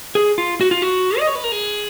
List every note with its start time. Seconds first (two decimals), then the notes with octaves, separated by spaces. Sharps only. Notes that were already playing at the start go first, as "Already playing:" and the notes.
0.15 G#4
0.38 F4
0.61 F#4
0.71 F4
0.82 F#4
1.19 D#5
1.27 C#5
1.35 B4
1.44 A#4
1.52 G#4